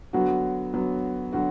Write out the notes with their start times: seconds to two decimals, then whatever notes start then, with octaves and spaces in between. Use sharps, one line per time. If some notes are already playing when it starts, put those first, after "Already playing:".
0.13 D3 F#3 B3 F#4
0.73 D3 F#3 B3
1.33 D3 F#3 F#4